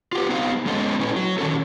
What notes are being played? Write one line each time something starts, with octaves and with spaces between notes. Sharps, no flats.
F4 G4 B4
B3 C4 D#4 F5
G#3 B3 C#4 A4 D#5
C#4 E4 B4
F#3
D#3 C#4 A4